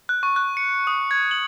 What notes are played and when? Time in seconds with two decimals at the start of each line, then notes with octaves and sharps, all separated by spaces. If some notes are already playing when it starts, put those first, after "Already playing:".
0.09 F#6
0.23 C#6
0.36 F#6
0.57 C#7
0.87 D#6
1.11 G#6
1.31 F#7